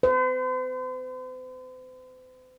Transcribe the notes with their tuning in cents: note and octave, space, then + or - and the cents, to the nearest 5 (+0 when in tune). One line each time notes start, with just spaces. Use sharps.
C5 -45